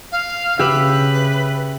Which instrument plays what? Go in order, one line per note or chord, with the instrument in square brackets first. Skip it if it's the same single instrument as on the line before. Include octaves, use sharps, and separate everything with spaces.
[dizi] F5
[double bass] C#3 [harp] G4 E5 [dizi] B4